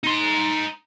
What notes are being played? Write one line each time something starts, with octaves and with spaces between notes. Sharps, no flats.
D#4 C6